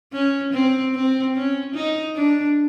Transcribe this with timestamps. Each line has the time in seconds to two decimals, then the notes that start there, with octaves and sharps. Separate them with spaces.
0.13 C#4
0.53 C4
0.95 C4
1.35 C#4
1.74 D#4
2.15 D4